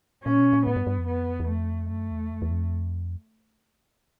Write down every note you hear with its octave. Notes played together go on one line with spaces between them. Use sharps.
A#2 C#4
B2
A#2
A2 B3
G2
G2
F2
B3
E2
F2 A3
F#2 A3
E2
F2
E2
F2